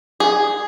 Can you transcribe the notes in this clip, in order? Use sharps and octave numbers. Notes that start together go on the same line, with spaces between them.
G#4